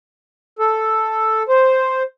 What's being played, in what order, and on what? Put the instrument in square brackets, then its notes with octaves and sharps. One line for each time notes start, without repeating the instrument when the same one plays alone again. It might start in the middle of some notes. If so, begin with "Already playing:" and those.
[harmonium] A4
C5